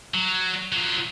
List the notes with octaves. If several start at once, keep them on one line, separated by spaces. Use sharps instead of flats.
F#3
F#3 F4